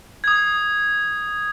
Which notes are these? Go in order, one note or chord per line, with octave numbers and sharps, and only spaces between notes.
D#6 G#6